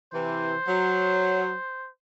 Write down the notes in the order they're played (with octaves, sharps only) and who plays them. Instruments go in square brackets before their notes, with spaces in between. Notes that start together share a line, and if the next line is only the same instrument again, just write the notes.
[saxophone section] C3 E3 [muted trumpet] C5
[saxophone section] F#3